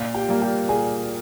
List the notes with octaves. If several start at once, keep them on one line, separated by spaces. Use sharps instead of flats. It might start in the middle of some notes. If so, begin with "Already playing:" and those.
Already playing: A#2 F4 F5
G4 G5
G3 A#3
G4 G5
A#2 G#4 G#5